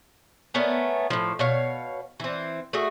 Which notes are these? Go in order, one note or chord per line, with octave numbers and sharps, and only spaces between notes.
A3 B3 C#4 A#4
A2 F3
B2 C#5 F5
E3 C4
A3 F#4 G#4